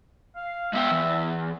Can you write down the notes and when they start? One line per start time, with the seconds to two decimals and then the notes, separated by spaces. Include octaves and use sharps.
0.36 F5
0.73 G#3 B3 E5 F5 G5
0.91 E2